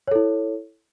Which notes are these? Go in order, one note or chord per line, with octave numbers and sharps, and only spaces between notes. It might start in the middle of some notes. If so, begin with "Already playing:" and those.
E4 A4 C#5